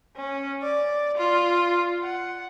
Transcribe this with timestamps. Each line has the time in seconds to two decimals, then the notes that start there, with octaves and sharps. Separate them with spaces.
0.16 C#4
0.62 D5
1.17 F4
2.03 F#5